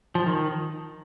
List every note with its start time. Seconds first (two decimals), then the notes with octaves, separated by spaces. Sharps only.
0.15 F3
0.26 D#3